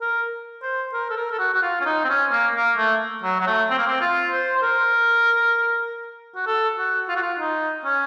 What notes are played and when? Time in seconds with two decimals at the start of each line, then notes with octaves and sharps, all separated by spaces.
0.01 A#4
0.63 C5
0.93 A#4
1.10 A4
1.17 A#4
1.32 A4
1.39 F#4
1.54 F#4
1.62 F4
1.81 C#4
1.86 D#4
2.04 C4
2.09 C#4
2.31 A#3
2.55 A#3
2.78 A3
3.24 F#3
3.40 F#3
3.47 A3
3.70 C4
3.78 A#3
3.88 C4
4.01 F4
4.31 C5
4.56 C5
4.62 A#4
6.36 F#4
6.47 A4
6.78 F#4
7.09 F4
7.16 F#4
7.23 F4
7.39 D#4
7.85 C#4